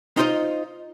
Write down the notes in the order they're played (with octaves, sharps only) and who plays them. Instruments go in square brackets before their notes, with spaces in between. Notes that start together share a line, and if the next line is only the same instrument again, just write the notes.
[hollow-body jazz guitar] D#4 F4 C5 D5 D#5